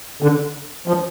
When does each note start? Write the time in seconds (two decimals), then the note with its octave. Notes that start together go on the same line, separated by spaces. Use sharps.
0.22 D3
0.88 F3